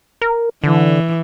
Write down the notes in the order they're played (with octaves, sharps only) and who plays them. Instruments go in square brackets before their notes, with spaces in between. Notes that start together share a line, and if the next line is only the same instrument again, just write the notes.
[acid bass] A#4
[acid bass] D3 [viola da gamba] E3